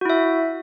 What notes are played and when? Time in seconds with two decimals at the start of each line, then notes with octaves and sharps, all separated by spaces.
0.01 F#4
0.05 E4
0.10 E5